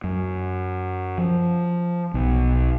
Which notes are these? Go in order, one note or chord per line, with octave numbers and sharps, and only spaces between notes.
F#2
F3
B1